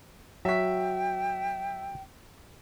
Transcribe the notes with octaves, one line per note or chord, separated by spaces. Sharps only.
F#3 F#4 E5 G5 B6